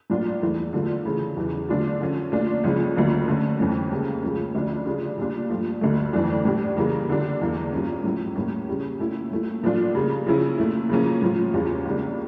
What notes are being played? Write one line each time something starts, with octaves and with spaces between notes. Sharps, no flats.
A2 F3 A#3 D4 F4
E2 E3 A3 E4
D3 F3 A3 D4 F4
C#3 E3 A3 C#4
E2 C#3 E3
D3 A3 D4 F4
D3 F3 C#4
A#2 A3 D4 F4
C#2 C#3 F3 C#4
D2 D3 F3 A#3
D3 A3 C#4
F2 E3 A3 C#4
C#2 C#3 G3 A#3
C#2 C#3 F3 C#4
D2 D3 F3 A3 D4
C#3 G3 D4 F4
A#2 G3 D4 F4
G2 F3 A3
D2 D3 A3
F2 E3 A3 D4
A2 G3 D4
C#3 E3 G3 A#3
D3 G3 D4
E2 E3 A#3
G2 F3 A#3 C#4
A2 F3 C#4 E4
A2 G3 A#3 C#4
C#3 G3 C#4
A#2 A3 C#4 E4
A#2 A3 E4
A2 F3 A3 D4 F4
C#3 G3 A#3
C#3 F3 C#4 E4
A#2 A3 E4
C#3 F3 A#3 C#4
A2 F3 C#4 F4
E2 C#3 G3 C#4 F4
C#2 C#3 G3 A#3 D4